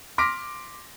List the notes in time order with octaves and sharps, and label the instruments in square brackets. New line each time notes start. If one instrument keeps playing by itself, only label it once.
[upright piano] C6 D6 F6 A#6 B6 D7